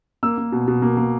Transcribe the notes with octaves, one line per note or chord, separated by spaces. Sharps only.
A#3 E6
A#3
B2
B2
A#3
A#3